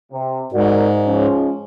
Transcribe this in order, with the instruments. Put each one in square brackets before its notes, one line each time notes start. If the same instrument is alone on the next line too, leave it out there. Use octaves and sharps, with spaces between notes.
[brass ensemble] C3
[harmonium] G#2 [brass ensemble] F#4 A#4 D5
[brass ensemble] F3 G#3 C#4